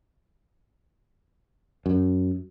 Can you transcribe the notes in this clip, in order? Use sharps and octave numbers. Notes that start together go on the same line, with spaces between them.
F#2